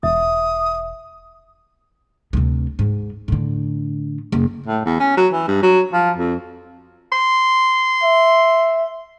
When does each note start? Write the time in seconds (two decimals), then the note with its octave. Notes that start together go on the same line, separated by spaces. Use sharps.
0.03 E1 E5 D#6
2.33 D2 C3
2.79 G#2
3.28 A2 D3
4.32 F#1
4.66 A2
4.86 E2
4.99 C#4
5.17 F#3
5.33 E3
5.47 G2
5.62 F#3
5.93 F3
6.16 F2
7.12 C6
8.04 E5